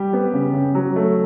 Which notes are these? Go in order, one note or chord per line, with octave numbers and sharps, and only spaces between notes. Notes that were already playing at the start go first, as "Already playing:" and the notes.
Already playing: G3 G4
B3
C#3
C#3
F#3
A3